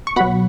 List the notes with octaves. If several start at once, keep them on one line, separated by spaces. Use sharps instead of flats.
C#6
B2 F#3 F#5 B5